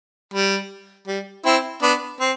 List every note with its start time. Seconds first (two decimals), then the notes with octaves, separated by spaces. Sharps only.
0.34 G3
1.07 G3
1.45 C4 E4
1.82 B3 D4
2.20 C4